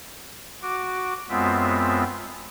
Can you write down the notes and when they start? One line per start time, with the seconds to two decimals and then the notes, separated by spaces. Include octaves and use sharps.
0.62 F#4 D6
1.29 F#2 G#3 B3 C4 F4 E5